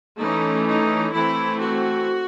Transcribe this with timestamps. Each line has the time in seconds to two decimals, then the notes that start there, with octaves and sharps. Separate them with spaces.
0.20 E3 A3 C#4 D#4
0.67 D#4
1.13 E3 A3 C4 E4
1.59 F#4